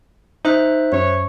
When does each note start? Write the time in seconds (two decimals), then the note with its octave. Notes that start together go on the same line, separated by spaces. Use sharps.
0.45 D#4 C5 E5 F#6
0.92 F#2 C#5